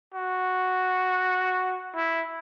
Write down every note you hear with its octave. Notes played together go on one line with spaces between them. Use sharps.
F#4
E4